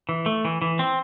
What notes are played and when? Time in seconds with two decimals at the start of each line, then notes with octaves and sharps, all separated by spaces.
0.09 E3
0.26 A3
0.45 E3
0.62 E3
0.79 C4